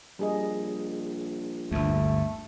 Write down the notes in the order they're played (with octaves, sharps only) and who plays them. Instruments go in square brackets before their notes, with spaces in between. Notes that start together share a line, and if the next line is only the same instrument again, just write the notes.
[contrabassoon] A#1 [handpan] G3 G#4 D#5
[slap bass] G1 D2 [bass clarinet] A3